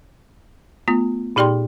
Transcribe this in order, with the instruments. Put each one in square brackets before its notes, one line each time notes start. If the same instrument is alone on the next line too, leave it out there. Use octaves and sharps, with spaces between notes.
[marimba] A3 B3 F4
A#2 D#4 G4 D5 G5 C6